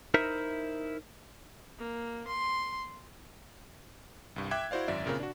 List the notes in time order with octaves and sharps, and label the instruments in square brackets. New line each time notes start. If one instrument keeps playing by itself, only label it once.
[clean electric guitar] D#4 E4 A#4 C5 E5
[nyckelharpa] A#3
C6
[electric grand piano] C2 G2
E5 G5 D6 F#6 G#6
E4 F#4 C5 D5 F5
G#1 F#2 D5 E5
A#2 C#3 C4 A#4
D4 F#4